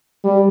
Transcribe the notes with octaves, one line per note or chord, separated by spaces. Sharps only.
G3